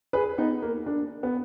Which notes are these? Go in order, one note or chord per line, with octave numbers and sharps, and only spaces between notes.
G#4 B4
B3 D#4
A#3
A#3 D4
B3